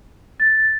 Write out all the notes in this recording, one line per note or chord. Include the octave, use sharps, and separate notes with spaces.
A6